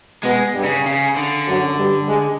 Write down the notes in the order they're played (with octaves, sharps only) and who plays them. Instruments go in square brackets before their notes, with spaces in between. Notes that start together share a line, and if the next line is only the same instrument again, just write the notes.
[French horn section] B2 B3 [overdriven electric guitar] G#3
[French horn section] G2 G3
[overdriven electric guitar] C#3
C#3
D3
[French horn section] F#2 F#3
G2 G3
G#3